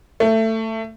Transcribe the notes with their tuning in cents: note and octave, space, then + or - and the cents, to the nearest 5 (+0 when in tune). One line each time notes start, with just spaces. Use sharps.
A3 +20